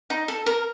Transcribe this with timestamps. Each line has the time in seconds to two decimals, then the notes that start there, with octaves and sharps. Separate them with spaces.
0.10 D#4
0.28 A4
0.46 A#4